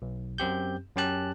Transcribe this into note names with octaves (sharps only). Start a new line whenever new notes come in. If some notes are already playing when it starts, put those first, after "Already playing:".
B1
F#2 C4 G4 G6
F#2 C#4 G4 A5 F#6